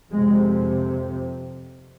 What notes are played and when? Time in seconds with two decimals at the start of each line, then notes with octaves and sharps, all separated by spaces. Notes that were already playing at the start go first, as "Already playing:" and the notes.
0.11 F2 C3 G#3